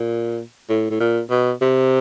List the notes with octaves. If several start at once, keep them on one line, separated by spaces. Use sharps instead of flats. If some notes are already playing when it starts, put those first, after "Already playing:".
Already playing: A#2
A2
A2
A#2
B2
C3